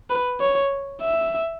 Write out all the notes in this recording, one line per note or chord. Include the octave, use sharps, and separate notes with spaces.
B4
C#5
E5